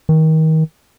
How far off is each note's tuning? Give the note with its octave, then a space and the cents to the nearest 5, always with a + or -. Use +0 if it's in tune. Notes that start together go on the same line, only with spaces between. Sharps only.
D#3 +30